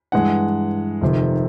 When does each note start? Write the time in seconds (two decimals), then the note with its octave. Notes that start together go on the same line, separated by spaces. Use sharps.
0.12 G2 E3 G#3 F#5
1.01 F1 F2 C3 D#3